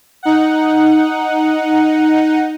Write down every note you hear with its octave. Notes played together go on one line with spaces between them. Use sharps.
D#4 F#5